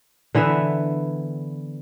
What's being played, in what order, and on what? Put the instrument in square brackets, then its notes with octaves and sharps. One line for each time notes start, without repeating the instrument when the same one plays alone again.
[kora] D3 E3 B3 E5